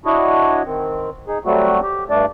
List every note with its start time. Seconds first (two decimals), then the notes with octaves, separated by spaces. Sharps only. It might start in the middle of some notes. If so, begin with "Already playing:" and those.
0.05 D4 E4 F#4 C#5 D#5
0.66 D#3 C4
1.28 D#4 G#4
1.45 F#3 G3 A3 C4 F#4
1.82 G4
2.10 G2 A3 D4 D5